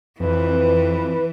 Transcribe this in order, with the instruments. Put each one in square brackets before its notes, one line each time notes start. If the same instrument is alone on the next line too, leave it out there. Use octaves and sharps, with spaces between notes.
[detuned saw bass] F2 [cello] E3 [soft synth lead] B4